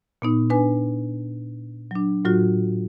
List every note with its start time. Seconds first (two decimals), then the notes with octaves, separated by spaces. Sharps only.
0.22 A#2 B3 D#4
0.50 D4 B4 G#5
1.91 F#3 D4
2.25 A2 F#3 F4 F#4